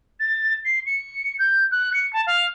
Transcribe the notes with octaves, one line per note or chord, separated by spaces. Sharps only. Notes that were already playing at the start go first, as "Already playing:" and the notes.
A6
C7
C#7
G6
F#6
C#7
A5
F5